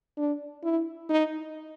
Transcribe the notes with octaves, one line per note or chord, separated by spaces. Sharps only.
D4
E4
D#4